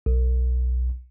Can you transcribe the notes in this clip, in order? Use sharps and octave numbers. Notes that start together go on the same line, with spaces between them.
B1